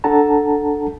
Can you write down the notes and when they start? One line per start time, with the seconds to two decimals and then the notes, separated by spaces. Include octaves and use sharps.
0.04 D4 A4 F#5 A5 A#5